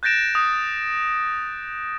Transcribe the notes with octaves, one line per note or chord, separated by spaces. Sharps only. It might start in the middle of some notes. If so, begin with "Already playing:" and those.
F#6 G6 A6 A#6 D7 E7
D#6